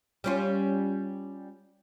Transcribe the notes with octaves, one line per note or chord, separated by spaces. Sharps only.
G3 C#4 F4